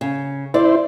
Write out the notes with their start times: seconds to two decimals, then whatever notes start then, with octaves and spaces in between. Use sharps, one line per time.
0.01 C#3
0.54 E4 C5 D5